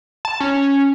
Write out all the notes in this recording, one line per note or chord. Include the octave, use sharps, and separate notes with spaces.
A5
C#4